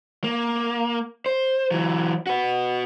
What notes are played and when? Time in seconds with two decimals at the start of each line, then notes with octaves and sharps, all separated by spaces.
0.24 A#3
1.26 C5
1.71 E3 F#3
2.27 F#4 B4